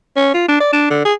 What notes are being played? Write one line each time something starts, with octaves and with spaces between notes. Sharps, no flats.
C#4
F4
D4
D5
D4
D3
G#4